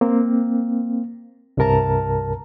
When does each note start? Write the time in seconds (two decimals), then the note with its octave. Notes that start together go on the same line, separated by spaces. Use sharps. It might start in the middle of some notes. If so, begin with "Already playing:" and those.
0.01 A#3 C4
1.57 C2 G2 C3 A#4 A5 A#5